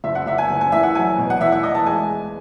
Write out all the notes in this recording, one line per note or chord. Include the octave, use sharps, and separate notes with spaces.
F#1 E5
F#5
F#1 E5
G#5
F#1
G#5
E3 E5
F#5
F#3 G#5
B2
F#5
E2 E5
F#5
E2 D#5
A5
G#3 G#5